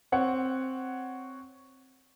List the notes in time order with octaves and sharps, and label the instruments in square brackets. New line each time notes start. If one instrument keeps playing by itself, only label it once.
[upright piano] C4 C#5 F#5